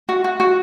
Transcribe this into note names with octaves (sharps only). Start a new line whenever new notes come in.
F#4
F#4
F#4